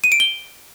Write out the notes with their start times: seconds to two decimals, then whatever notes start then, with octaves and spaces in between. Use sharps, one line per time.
0.04 D#7
0.12 D7
0.20 G7